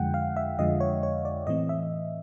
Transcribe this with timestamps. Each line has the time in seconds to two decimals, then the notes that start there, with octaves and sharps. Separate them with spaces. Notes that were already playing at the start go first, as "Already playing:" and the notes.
Already playing: F2 D3 F3 G#3 F#5 G5
0.14 F5
0.37 E5
0.59 F2 D3 F3 G#3 D#5
0.81 C#5
1.03 C#5
1.25 D5
1.47 A2 E3 A3 C4 D#5
1.69 E5